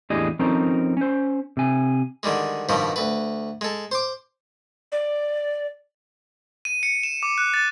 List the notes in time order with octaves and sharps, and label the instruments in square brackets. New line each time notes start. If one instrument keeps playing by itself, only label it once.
[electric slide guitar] E2 A2 D4 G4 G#4 D#5
F3 C4 C#4 D#4 A4 A#4
C#4 C5
C3 G#5
[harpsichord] D3 D#3 G3 G#3
G2 B2 D#3 F3 G3
D2 B4
G#3 A4
C5 C6 D6
[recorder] D5
[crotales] D#7
C#7
E7
D6
F#6
A6